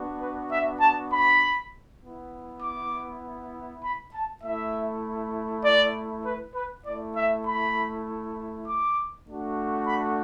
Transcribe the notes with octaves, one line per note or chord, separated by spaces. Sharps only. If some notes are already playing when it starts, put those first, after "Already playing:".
Already playing: B3 D4 F#4
B4
E5
A5
B5
B3 E4
D6
B5
A5
A3 E4 E5
D5
B4
B4
A3 E4 D5
E5
B5
D6
A3 D4 F#4
B5